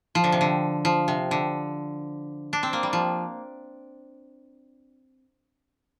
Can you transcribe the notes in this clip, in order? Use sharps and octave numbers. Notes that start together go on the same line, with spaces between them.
F3
D3
C3
D3
F3
C3
D3
D4
C4
A#3
G3
F3